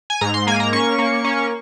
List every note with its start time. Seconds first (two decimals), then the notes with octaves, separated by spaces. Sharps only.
0.10 G#5
0.21 G#2 A#5
0.34 C6
0.47 A#3 G#5
0.60 A#5
0.73 C#4 C#6
0.99 A#3
1.24 C#4